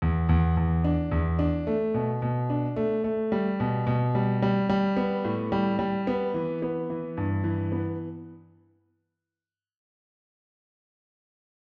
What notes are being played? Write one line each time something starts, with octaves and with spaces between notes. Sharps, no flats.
E2
E2
E2
D4
E2
D4
A3
B2
B2
D4
A3
A3
G3
B2
B2
G3
G3
G3
B3
A2
G3
G3
B3
E3
B3
E3
G2
E3
B3